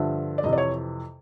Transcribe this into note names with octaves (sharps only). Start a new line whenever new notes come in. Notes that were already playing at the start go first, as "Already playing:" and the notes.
Already playing: G2 D3 F3 E5
D5
F2 C3 E3 D#5
D5
C#5